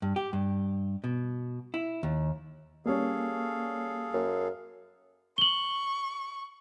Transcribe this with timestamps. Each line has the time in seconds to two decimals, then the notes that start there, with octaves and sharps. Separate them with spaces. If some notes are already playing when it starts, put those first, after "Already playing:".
0.02 G2
0.16 G4
0.33 G2
1.04 B2
1.74 E4
2.03 D#2
2.86 G3 A#3 C#4 G#4 A4 F5
4.14 F#2
5.38 C#6 F#7 G7